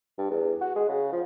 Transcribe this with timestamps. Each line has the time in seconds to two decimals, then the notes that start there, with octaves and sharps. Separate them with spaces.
0.18 G2
0.31 E2
0.61 F#4
0.75 G#3
0.89 C#3
1.12 F3